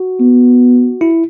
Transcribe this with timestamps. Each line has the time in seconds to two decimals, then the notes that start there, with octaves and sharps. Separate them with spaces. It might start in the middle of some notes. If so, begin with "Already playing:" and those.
Already playing: F#4
0.20 B3
1.01 E4